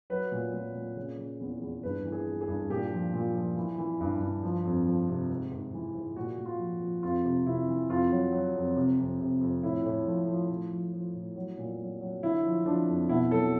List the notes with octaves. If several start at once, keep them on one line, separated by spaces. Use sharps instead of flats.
F#3 B4
A#2
A#2
A#2
C#3
C#3
E2
E2
G2 B4
E3
G#4
E3
G#4
G2
A#2 G4
F3
A#2
F3
E3
E3
G2
G2
F3
F2
F3
C3
G#2
G#2
E3
G#2
A#2 F#4
A#2
F4
F3
F3
F2 F4
C3
C3 E4
E3
F2 F4
F#3
F#3
F2
C3
F2
C3
F2
A2 E4
A2
F3
F3
A2
F3
F3
A2
F#3
A#2
F#3
F#3
D3 E4
F3
F3 D4
F2
B2 E4
F#3 A4